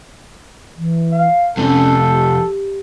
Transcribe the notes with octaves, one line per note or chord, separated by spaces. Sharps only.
E3
F5
F2 C3 C#4 A4
G4